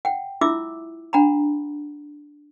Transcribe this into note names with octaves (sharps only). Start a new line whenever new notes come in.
F#5 G5
E4 F4 E5 D6 E6
D4 F#5 A#5 B5